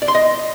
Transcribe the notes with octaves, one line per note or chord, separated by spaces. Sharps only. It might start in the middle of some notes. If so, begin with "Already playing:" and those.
D5
C6
D#5